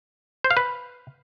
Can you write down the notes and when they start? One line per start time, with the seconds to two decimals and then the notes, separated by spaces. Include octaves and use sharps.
0.44 C5
0.51 F5
0.57 B4